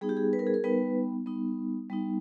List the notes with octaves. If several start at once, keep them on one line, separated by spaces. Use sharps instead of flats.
G3 B3 D#4 G#4
G4
G#4
B4
A#4
G#4
A#4
G3 B3 D#4 B4
G3 B3 D#4
G3 B3 D#4